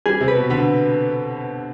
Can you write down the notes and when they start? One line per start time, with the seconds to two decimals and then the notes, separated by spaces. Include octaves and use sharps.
0.06 G3 G#4
0.21 C3
0.28 B4
0.35 B2
0.50 D3 B4